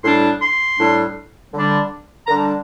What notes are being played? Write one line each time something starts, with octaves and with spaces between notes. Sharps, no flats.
A2 G3 D4 C6
C6
A2 G3 D4
D3 G3 D4
D3 G3 D4 A#5